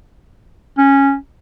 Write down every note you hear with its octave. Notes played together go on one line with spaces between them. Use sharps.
C#4